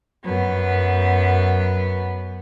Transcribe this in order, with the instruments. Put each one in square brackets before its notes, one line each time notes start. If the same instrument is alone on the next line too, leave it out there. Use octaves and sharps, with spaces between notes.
[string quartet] F#2 B3